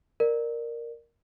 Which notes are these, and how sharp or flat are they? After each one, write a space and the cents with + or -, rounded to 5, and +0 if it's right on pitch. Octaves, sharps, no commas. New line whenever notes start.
A#4 +0 D5 +25